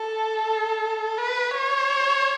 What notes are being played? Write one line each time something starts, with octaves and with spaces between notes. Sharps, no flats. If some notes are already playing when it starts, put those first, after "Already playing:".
Already playing: A4
B4
C#5